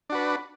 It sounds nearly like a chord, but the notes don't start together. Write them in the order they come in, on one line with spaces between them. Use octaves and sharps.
D4 F#4 B4